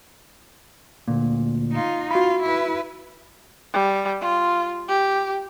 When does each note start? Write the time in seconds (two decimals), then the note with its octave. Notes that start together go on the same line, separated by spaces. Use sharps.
1.08 D2 A#2
1.72 D#4 F4
2.11 F4 F#4 B5
2.42 E4 B4
3.74 G3
4.21 F4
4.89 G4